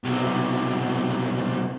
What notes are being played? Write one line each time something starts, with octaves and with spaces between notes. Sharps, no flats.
B1 C3